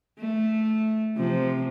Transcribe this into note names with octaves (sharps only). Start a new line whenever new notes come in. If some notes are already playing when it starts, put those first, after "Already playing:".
A3
C3 F3